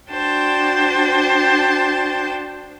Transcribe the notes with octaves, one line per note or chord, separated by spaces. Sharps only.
D4 F#4 C5 G5 A5